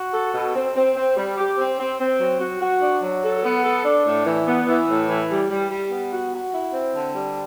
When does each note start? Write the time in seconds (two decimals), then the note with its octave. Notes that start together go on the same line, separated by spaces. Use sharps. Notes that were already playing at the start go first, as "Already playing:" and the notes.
Already playing: F#4
0.13 A4
0.34 B2
0.55 C4
0.76 C4
0.96 C4
1.17 G3
1.38 G4
1.58 C4
1.79 C4
1.99 C4
2.20 F#3
2.40 F#4
2.61 F#4
2.81 D4
3.02 F#3
3.23 A4
3.43 B3
3.64 A4
3.85 D4
4.06 A2
4.26 E3
4.46 B3
4.68 E3
4.88 A2
5.09 E3
5.29 G3
5.50 G3
5.71 G3
5.91 B3
6.12 F#4
6.32 F#4
6.53 E4
6.74 C4
6.94 D3
7.14 G3